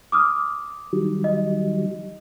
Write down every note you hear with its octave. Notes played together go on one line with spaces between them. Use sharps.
D6 D#6 F6
D#3 F#3 G3
D#5